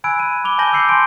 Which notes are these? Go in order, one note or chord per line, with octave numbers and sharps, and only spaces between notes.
G#5 B5 E6 F#6 G#6 D7
B5 D#7
B5 D6 F7 G7
G#5 A5 G6 A#6 F#7 G7
D6 E6 G6 C7 C#7 F#7
G#5 C6 D7